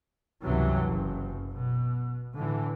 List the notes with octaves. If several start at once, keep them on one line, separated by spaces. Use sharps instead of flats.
C#2 G2 C3 E3 F#3
F#1 F#2
B2
A2 D3 E3